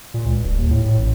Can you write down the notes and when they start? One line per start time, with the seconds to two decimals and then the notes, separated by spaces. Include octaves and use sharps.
0.14 A#2
0.26 C#2
0.44 D#1
0.58 D#2
0.71 A2
0.85 A2
0.98 A1